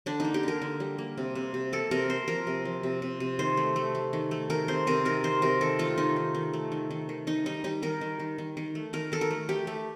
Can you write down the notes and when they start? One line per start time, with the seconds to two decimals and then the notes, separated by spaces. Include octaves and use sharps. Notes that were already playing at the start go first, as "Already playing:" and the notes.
0.06 D3 D4
0.20 A#3 D#4
0.34 G4
0.43 D3 A#4
0.62 D3
0.80 G3
0.98 A#3
1.18 C3
1.35 C3
1.54 C3
1.73 A#3 A4
1.91 C3 A#4
2.10 A#3 C5
2.28 F3 A#4
2.47 C3
2.65 F3
2.83 C3
3.02 C3
3.20 C3
3.39 D#3 C5
3.57 A3
3.76 A3
3.95 A3
4.13 D#3
4.31 A3
4.50 D#3 A#4
4.68 C3 C5
4.87 C3 A#4
5.05 D#3 A#4
5.24 D#3 C5
5.42 C3 A#4
5.61 D#3 A4
5.79 A3 F4
5.98 D#3 D#4
6.16 D#3
6.35 D#3
6.53 A3
6.72 D#3
6.91 D#3
7.09 D#3
7.27 D#3 D#4
7.46 G3 D#4
7.64 G3 D#4
7.82 D#3 A#4
8.01 D#3
8.20 D#3
8.38 D#3
8.57 D#3
8.75 A3
8.93 D#3 A#4
9.12 D#3 A4
9.21 A#4
9.31 A3
9.49 A3 G4
9.67 A3